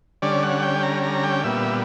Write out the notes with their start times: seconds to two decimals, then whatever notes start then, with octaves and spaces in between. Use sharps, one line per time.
0.22 D3 G3 C#4 D5
0.43 F#5
0.62 G5
0.83 A#5
1.03 A#5
1.24 G5
1.44 A#2 G3 B3 E5